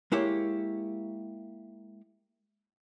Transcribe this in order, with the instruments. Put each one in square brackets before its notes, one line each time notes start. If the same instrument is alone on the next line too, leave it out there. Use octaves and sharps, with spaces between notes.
[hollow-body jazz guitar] G#3 A#3 E4 G4 C#5